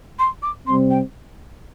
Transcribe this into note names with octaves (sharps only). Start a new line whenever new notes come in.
C6
D6
C3 G3 C4 C6
G5